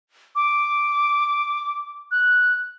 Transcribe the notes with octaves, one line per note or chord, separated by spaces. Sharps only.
D6
F#6